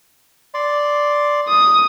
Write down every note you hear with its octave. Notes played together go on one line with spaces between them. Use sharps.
D5 C6
D#6